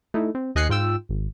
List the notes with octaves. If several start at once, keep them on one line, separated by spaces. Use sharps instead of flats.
A3 D#4 E4
C4
D#2 D#5 G#5 F#6 C7 C#7
G#2 F4 G5 E6
G#1